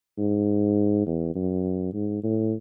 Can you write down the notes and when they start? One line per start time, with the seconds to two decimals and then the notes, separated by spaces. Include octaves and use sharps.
0.18 G#2
1.06 E2
1.35 F#2
1.94 G#2
2.23 A2